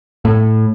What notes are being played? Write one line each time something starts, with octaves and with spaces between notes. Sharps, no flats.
A2